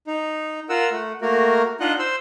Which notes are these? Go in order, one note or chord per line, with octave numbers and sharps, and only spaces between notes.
D#4
F4 A#4 F#5 E6
A3 F#5
A3 A#3 F#4 A#4
D4 D#4 F4 D#5 F#5 F#6
C5 C6 E6